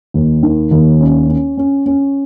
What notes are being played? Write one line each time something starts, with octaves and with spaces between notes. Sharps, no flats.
D#2
D#3
D#2
C#4
C#4
C#4
C#4